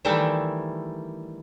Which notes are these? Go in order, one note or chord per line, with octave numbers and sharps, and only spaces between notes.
D#3 E3 G3 A3 D4 E4